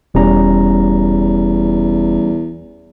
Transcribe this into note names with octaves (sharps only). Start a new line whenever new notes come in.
E1 E2 G3 C#4 A#5